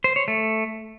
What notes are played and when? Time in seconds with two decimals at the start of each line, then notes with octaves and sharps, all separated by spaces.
0.04 C5
0.16 C#5
0.28 A3